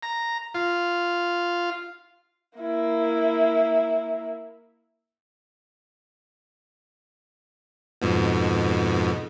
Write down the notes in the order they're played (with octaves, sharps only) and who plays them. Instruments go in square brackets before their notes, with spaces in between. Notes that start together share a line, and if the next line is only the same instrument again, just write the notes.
[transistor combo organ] A#5
F4
[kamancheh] A#3 E4
[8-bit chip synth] F2 G#2 B2